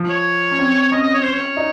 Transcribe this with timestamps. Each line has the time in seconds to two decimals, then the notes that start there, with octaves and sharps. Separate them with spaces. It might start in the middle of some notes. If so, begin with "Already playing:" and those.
Already playing: F3
0.10 C#5
0.52 C#4
0.59 C4
0.92 C#4 D#5
1.02 D#5
1.14 C#5
1.23 C5
1.33 C#5
1.57 D#4